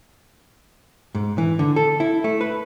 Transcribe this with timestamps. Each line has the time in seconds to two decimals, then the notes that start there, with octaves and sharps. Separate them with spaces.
1.15 G#2
1.38 E3
1.59 D3
1.76 A4
2.00 E4
2.24 A3
2.41 B4